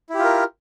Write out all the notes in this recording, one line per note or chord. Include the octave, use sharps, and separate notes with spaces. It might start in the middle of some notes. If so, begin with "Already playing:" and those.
E4 F4 G4 A#4